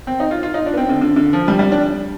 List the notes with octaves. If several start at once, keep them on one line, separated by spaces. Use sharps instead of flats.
C4
D#4
F4
F4
D#4
D4
B3
C4
D3
D3
D3
F3
G3
G3
D4